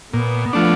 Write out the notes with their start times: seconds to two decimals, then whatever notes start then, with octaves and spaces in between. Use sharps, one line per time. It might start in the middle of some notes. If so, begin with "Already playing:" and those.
0.13 A#2 B3
0.53 F3 A3 D4